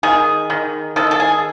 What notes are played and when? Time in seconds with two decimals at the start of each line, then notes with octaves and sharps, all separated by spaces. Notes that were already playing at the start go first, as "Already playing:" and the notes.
0.03 D#3 G#4
0.50 D#3
0.96 D#3 A4
1.11 A4
1.20 G#4